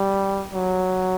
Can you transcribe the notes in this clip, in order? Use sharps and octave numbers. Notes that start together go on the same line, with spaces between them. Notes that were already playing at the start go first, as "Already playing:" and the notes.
Already playing: G3
F#3